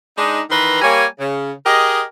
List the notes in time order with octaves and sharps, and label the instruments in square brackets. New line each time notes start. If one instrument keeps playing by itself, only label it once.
[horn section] G#3 D4 D#4
D#3 E3 B4 A#5 C6
G3 A#3 C#5 G#5
C#3
G4 G#4 A#4 D#5